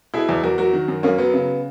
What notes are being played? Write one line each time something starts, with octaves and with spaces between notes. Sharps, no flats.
B2 E4 G#4
E2
E2 F#4 A#4
F#3 F#4 A#4
D#3
F#2
F#2 A#3 C#4
F#3 B3
C#3